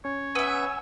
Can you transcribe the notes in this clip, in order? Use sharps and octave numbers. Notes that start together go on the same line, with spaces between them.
C#4 C#5
B3 E5 G#5 E6